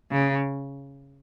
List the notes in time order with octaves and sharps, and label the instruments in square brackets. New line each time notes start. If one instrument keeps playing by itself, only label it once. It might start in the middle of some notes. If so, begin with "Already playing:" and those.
[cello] C#3